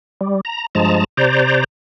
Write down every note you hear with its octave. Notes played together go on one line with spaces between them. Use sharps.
G3
A#5
G2 F3 G#3 A5 A#5
C3 C5 D5 A#5